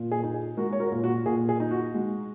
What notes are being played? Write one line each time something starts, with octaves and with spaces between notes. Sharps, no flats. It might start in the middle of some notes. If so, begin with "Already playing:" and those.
Already playing: A#2
G#4
D#4
G#4
G#3 F#4 A#4
C#5
F#4 A#4
A#2
F#4
A#2 G#4
G#4
D#4
F#4
G#3 F#4